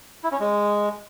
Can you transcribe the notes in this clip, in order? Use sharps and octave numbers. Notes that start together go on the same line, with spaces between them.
E4
C#4
G#3